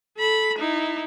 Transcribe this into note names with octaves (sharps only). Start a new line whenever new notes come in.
A4 B5
D#4 E4